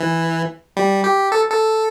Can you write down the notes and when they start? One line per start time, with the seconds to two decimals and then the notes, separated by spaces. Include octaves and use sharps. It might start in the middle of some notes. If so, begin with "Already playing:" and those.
Already playing: E3
0.77 G3
1.04 G4
1.32 A4
1.51 A4